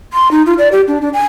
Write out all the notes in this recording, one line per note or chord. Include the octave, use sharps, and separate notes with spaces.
C6
D#4
F4
D5
G4
D4
D4
G#5